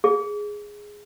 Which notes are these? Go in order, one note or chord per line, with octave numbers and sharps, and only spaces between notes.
G#4